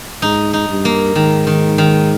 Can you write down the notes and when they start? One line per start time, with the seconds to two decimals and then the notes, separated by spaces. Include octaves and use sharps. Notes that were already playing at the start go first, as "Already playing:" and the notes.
0.22 G#2 D#4
0.53 D#4
0.69 G2
0.85 A#3
1.15 G#2 D#3
1.47 D#3
1.78 D#3